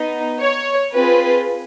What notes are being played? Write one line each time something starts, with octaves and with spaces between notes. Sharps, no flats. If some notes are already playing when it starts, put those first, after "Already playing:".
Already playing: B3 D#4
C#5
C4 F4 G#4 B4